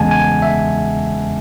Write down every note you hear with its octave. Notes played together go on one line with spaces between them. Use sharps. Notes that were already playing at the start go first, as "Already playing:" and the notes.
Already playing: E2 C#3 G#3 F#5 G#5 A5
G#5
E5